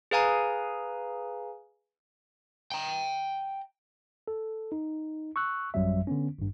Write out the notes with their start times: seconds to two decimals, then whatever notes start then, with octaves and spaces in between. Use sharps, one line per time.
0.11 G#4 B4 F5 G#5 A#5
2.72 G5 A#5
4.28 A4
4.72 D#4
5.36 C#6 E6 F#6
5.74 A1 F#2 F#3 G3 E5
6.07 D3 B3 C#4
6.38 G#1 G2